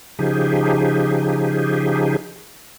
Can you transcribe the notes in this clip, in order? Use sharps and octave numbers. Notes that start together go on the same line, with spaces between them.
C#3 F3 D#4 G4 G#4